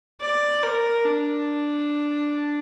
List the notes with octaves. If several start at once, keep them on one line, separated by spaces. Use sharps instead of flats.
D5
A#4
D4